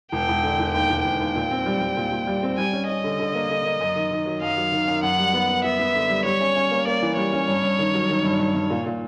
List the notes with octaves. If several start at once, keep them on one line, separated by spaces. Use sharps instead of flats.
E1 G5
E1
D3
E1
D#2 G5
E1
E1 G5
D#2
A#2
C4
G3
G3
A#2
A#2
G3
C4
G3 G#5
C#4
C#4 D#5
D3
D3
A#3
D3
A#3
F#2
D#3
D#3
F#3
F#2 F5
F#3
D#3
F#2
F#2 F#5
G3
B3
B3
B3 E5
B3
D3
G3
G3 C#5
C#4
C#4
A#3
A#3 D5
E3
G3 C#5
C#4
G2
G2
D#3
F#3
D#3
G2
G2
G2
A#2
A#2